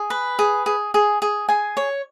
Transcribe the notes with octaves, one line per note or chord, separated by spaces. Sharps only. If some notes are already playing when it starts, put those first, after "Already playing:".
Already playing: G#4
B4
G#4
G#4
G#4
G#4
G#4 G#5
C#5